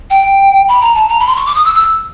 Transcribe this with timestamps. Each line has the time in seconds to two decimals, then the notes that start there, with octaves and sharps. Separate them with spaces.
0.10 G5
0.68 B5
0.81 A#5
0.95 A5
1.08 A#5
1.20 B5
1.27 C6
1.36 C#6
1.46 D6
1.55 D#6
1.65 E6
1.75 E6